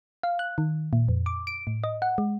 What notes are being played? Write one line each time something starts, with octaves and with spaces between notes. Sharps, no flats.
F5
F#6
D#3
A#2
F2
D6
D7
A2
D#5
F#5
G#3